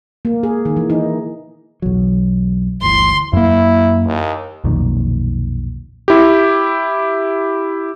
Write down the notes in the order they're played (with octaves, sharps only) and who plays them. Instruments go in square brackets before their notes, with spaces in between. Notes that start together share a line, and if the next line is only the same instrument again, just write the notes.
[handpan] A#3
G#4
D#3
E3
D#4
[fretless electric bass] B1 E2 F#3
[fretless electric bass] G1 D2 E3 [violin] C6
[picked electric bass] F#2 A#3 [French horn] E4
[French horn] D#2
[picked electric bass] B1 F2 A#2 D#3
[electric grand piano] E4 G4